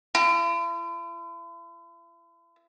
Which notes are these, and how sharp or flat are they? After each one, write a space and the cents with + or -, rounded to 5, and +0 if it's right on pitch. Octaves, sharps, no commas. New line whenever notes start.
E4 +45